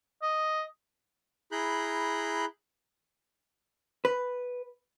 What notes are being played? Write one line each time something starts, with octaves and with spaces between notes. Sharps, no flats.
D#5
E4 G#4 A#5 B5 F#6 G6
B4